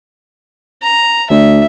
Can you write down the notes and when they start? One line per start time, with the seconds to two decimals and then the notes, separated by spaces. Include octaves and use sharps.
0.83 A#5
1.30 D2 E5